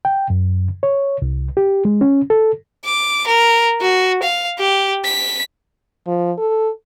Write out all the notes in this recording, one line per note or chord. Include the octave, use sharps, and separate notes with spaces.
G5
F#2
C#5
C2
G4
G#3
C#4
A4
D6
A#4
F#4
F5
G4
B6
F3
A4